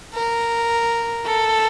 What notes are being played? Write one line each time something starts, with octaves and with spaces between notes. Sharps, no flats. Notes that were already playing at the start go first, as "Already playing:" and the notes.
A#4
A4